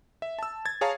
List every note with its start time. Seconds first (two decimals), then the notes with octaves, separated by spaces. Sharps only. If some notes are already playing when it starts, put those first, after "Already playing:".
0.22 E5
0.39 A5 E6
0.65 G#6 A6
0.81 G#4 C#5 F5 A5 A#5